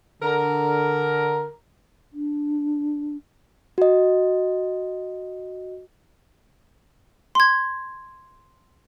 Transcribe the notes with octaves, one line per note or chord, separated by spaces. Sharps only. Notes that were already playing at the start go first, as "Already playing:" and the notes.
D3 A#4
D4
F#4 D#5
C6 G#6